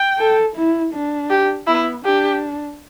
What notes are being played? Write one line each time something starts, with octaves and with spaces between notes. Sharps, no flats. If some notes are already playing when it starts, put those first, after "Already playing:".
Already playing: G5
A4
E4
D4
G4
B3 E4
D4 G4